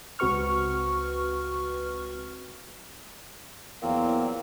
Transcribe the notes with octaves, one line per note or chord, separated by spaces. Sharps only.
C#2 C4 F#4 B4 C#6 F6
E2 A#2 F#3 A#3 C4